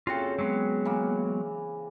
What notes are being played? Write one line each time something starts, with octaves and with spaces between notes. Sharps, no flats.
C#3 C4 F4 F#4 A4
F#3 G#3 B3
E3 A#3